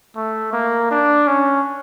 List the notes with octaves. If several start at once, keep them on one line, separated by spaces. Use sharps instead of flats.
A3
A#3
D4
C#4